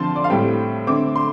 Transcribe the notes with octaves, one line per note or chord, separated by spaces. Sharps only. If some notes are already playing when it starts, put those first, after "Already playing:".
Already playing: D3 F3 C4 A5 C6
D5
F5
A2 G3 C4 G5
D3 A3 C4 D6
C6